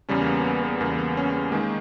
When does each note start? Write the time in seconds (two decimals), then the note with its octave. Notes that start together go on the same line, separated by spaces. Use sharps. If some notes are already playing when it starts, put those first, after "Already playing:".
0.09 E2 C#3 G3 C#4
0.22 A#3
0.27 B3
0.40 C#4
0.44 B3
0.63 B3
0.81 E2 C#3 G3 A#3
0.99 B3
1.17 C#4
1.35 B3
1.52 D#3 G#3 A#3